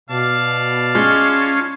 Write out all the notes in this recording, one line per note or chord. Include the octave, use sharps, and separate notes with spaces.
B2 D5 F5 A5
G#3 C#4 F4